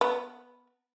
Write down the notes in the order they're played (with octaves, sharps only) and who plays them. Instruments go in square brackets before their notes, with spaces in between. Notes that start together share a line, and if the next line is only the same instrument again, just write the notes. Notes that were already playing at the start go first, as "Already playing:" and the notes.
[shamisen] B3